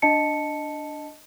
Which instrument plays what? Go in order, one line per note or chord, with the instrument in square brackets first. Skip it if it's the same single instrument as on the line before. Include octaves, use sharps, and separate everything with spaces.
[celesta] D4 D#5 A5 C#7